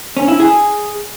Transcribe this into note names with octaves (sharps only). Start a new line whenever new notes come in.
C#4
E4
G#4